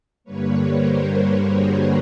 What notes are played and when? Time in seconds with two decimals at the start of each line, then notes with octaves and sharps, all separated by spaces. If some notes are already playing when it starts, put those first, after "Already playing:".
0.24 G2 D3 G3 A#3 B4 C#5
0.64 A#4 C5
1.04 A#4 C5
1.44 F#4 G#4